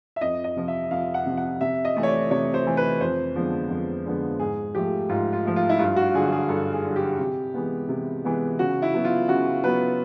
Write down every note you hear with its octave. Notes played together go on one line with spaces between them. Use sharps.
E5
F2 D#5
D#5
C3 F3
E5
F2 F5
F#5
C3 F3
F#5
C3 E5
D#5
E3 A3
C#5
D5
C3 C#5
C5
E3 A3
B4
F2 C5
D3 F3 G#3 B3
F2
D3 F3 G#3 B3
G#2 G#4
F3 A3 G4
G#2 F4
F4
F3 A3
F4
E4
G2 F4
F#4
D3 F#3 G#4
G#4
G2 A4
G#4
D3 F#3
G4
C3
E3 G#3 B3
C3
E3 G#3 B3
C#3 F#4
E4
F#3 B3
F4
C#3 F#4
F#3 B3 B4